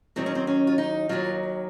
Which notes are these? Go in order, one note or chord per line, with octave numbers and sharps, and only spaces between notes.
D#2 D#3 F#3 C4
C#4
C4
C#4
F4
D#4
D#2 D#3 F#3 F4